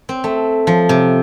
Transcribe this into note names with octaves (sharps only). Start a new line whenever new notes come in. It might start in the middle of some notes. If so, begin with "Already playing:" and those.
C4
A3
F3
C3